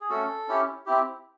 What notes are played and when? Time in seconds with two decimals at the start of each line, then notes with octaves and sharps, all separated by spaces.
0.01 G#4
0.09 A3 C#4 F#4 A4
0.48 C#4 E4 G4
0.86 C4 E4 G4